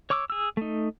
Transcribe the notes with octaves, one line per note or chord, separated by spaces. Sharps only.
C#5 C#6 D6 E6
G#4 E6
A3 D#4